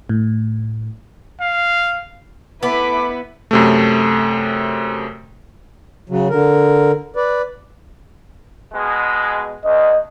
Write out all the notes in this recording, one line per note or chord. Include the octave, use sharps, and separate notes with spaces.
A2
F5
A3 B3 E4 B4 B5 D6
F#2 C3 A3
C#3 F#3
D3 A#4
B4 D5
B2 G#3
D2 D#5